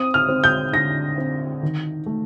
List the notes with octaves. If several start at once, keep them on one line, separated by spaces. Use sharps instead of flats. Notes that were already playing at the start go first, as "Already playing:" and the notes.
Already playing: C4 D#6
F6
C4
G6
D3 A#6
C4
D#3
A3